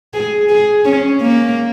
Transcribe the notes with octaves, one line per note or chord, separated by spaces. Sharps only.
G#4
G#4
C#4
A#3